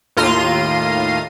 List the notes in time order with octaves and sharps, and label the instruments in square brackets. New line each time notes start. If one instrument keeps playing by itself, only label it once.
[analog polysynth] D#2 A2 F4 A#5 C6 D#7